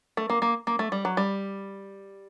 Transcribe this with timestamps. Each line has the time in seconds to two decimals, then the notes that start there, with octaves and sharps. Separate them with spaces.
0.17 A3
0.30 A#3
0.42 A#3
0.67 A#3
0.79 A3
0.92 G3
1.05 F#3
1.17 G3